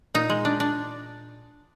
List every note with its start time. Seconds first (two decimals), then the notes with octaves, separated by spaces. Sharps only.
0.14 A#2 D#4
0.30 G#3
0.45 D4
0.60 D4